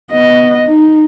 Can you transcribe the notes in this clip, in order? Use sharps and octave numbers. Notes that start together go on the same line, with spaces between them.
B3 D#5
D#4